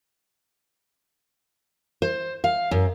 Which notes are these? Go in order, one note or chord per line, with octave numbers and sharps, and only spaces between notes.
C5
F5
F#2